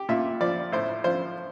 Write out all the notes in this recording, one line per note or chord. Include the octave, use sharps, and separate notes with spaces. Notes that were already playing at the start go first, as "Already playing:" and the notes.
Already playing: G4
A#2 E5
F3 D5
A2 C5
F3 C5